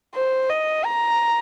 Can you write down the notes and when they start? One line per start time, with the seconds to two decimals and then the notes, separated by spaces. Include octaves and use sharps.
0.15 C5
0.50 D#5
0.85 A#5